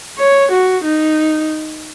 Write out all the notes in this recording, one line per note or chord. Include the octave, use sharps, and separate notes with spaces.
C#5
F#4
D#4